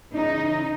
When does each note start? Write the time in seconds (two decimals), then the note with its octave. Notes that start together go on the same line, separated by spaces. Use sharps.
0.14 C#3 E3 D#4